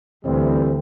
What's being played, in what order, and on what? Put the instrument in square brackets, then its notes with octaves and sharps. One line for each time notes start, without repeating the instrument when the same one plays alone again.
[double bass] D2 [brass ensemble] E3 G3 C4